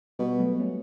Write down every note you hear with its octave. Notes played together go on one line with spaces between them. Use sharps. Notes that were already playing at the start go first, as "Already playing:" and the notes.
B2 G3
F#3 A3
A3 C#4